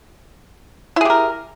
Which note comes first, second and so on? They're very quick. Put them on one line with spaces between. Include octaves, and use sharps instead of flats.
E4 G#4 G4 A#4